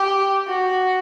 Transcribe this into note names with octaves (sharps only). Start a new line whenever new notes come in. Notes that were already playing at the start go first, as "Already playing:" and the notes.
Already playing: G4
F#4